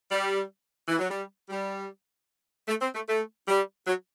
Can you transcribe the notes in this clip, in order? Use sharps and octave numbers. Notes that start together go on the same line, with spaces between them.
G3
E3
F#3
G3
G3
A3
C4
A3
A3
G3
F#3